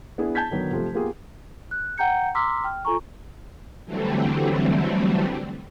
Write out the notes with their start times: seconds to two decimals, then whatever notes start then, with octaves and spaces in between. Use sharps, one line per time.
0.18 B3 D4 E4 G#4
0.35 A5 G6 G#6 B6
0.50 D3 D#3 F#3 B3
0.71 C3 F3 A3
0.93 A#3 B3 F4 G4 G#4
1.71 F#6
1.98 F#5 G5 A#5 G6 C#7
2.35 A#5 C6 D6 E6 F6 B6
2.64 G5 F6
2.85 F4 A4 G#5 A#5 C#6
3.85 D3 E3 F#3 G3 A3 C4